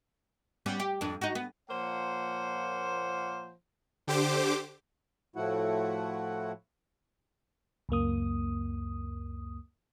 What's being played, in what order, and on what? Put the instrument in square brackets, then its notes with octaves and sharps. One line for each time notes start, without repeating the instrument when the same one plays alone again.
[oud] G3 B3 C#4
G4
F2 D4
D#4 F#4
B3
[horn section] A#2 F3 A#3 C5 C#5 F#5
[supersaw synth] D3 G4 C5 D6
[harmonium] A2 F3 A3 E4 F#4 F#5
[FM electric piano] C#2 F#2 A#3 D#6